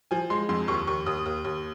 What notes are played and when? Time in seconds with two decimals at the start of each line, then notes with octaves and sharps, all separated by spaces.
0.11 F3 G#5
0.30 G#3 C6
0.49 F2 C6
0.68 D#2 C#6
0.87 D#2 C#6
1.06 D#2 D#6
1.26 D#2
1.44 D#2